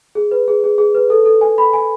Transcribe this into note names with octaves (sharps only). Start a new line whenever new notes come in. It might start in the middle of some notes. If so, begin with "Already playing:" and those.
G#4
B4
G#4
G#4
G#4
B4
A4
A4
G#5
B5
G#5